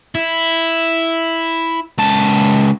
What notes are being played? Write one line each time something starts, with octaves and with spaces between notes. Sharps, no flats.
E4
C#2 A5